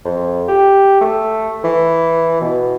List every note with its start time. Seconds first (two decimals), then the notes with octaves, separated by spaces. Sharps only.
0.05 F2
0.48 G4
1.01 A3
1.64 E3
2.41 B2